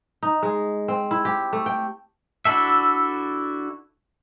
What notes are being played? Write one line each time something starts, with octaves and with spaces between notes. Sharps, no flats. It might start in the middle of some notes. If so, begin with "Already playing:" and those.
D#4
G#3
C4
E4
G4
A3
G5
D4 E4 F#4 A4 E5